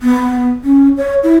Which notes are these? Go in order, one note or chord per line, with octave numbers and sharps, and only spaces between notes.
B3
C#4
C#5
E4